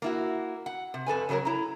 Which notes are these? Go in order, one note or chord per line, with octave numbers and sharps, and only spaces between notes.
A#3 E4 F#4
F#5
C3
F2 A4 B4 G#5
C#3 F#3 A#3 C#4 A#4
E4 A#5